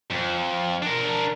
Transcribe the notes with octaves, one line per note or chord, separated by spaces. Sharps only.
F2
D4 A#4